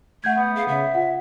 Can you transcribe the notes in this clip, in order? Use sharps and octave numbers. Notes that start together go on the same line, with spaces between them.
A3 F#5 G6 G#6
B3
G#4 F5
C#3 E5
F4 F#5